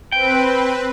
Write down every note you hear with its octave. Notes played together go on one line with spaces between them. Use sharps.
C4 B4 G5